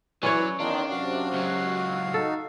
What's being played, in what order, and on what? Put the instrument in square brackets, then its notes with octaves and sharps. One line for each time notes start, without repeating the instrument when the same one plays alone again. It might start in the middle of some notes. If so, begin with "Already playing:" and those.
[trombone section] E3 [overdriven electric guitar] F#3 [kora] C#4 C#5 [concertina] E4 B4 D5
[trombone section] E2 D#3 [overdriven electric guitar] D4 [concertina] A#4 F5 C6
[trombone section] F#2 C3 [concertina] F#4 F5
[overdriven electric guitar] C#2 F#3
[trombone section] D#4 [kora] A4